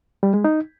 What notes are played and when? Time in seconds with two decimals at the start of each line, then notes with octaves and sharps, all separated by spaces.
0.23 G3
0.34 G#3
0.44 D#4